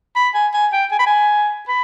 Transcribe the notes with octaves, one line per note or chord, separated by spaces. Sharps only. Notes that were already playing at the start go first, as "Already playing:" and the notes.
B5
G#5
G#5
G5
G#5
B5
G#5
B5